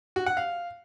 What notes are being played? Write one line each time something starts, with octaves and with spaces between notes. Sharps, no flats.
F#4
F#5
F5